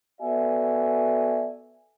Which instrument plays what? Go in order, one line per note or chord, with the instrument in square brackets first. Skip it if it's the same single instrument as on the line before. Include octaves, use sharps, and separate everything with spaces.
[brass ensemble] B3 F#4 A4 D5 E5 G#5